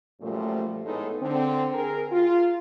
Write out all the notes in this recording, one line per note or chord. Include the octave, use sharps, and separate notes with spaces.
F#2 A#2 F3 G3 A3
A2 G#3 B3 D#4 E4 A4
D3 C4
G#4 A#4
F4